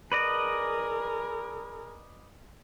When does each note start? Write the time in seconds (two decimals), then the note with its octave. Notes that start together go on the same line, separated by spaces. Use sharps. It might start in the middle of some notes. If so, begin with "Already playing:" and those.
0.12 G#4 A#4 B4 D5 D#5